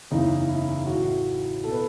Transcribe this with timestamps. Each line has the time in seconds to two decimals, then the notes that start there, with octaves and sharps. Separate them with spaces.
0.11 F#1 E2 C#3 E3 D#4
0.49 E4
0.86 A1 A2 E3 F#4
1.64 B2 A4
1.72 B4